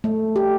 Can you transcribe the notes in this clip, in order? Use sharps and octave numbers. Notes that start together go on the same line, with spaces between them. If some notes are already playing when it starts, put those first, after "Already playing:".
A3
G4